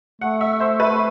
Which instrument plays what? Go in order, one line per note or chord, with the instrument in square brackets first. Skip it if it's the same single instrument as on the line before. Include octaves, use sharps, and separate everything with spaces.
[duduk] A3 [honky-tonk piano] F#5
[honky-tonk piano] E5
C5
B4